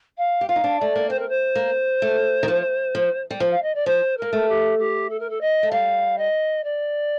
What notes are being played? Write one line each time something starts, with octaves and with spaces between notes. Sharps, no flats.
F5
G4
F4 F5
D#4
D4
A3 D5
A#3
C4 C5
A#4
C5
A#3
A3
D#3
F3
F3
G3
F3
F5
D#5
D5
F3 C5
A#3 A#4
A3
G4
G4
A4
A#4
A4
D#5
A3
G3 F5
D#5
D5